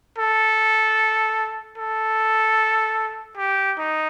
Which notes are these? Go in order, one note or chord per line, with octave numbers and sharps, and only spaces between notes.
A4
A4
G4
D#4